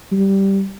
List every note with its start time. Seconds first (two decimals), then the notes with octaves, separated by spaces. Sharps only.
0.12 G3